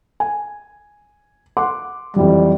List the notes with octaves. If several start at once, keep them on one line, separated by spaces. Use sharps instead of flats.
G#5
F#5 C6 D6
F2 E3 F#3 G3